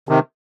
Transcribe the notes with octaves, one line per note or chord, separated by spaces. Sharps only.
C3 D#3